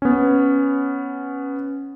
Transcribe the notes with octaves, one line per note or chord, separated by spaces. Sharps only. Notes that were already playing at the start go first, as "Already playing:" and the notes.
B3 C#4